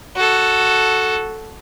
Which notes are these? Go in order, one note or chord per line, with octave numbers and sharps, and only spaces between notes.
F#4 A4